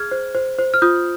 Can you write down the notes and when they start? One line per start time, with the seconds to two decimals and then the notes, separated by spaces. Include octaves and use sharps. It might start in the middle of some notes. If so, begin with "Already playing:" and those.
Already playing: G#4 F6 G#6
0.11 C5
0.35 C5
0.59 C5
0.74 F6
0.82 F4 D#6 G6